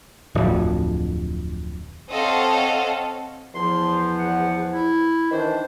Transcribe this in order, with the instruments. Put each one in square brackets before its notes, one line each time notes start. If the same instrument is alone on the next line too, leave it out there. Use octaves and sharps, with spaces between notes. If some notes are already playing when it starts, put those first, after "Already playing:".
[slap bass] D1 F2
[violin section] C4 A4 C#5 D#5 F5 F#5
[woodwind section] E2 F3 [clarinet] C6
[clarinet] F#5
E4
[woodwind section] D#3 E3 D4 [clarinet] C5